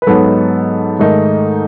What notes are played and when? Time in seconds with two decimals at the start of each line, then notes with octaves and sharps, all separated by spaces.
0.02 B4
0.07 G#2 F#3 B3 D#4 A4
0.99 G#2 D#3 A3 D#4